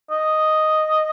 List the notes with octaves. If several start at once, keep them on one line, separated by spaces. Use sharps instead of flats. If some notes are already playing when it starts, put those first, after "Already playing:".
D#5